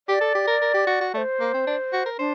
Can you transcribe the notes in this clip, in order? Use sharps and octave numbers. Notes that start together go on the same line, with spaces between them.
G4 D5
A4
G4
A#4
A#4
G4
F#4
F#4
A3 C5 D5
A#3
C4
D4
F#4
A#4
D4 C5